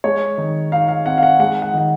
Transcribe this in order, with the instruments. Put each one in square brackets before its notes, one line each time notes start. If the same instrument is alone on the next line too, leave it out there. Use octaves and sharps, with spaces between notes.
[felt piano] G#3 [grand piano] C#5
[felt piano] D#3
[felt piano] D#4 [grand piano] F5
[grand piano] F5
[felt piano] C4 [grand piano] F#5
[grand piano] F5
F#5
[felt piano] G#3 [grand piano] F#5
[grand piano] F#5
[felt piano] D#3 [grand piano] F#5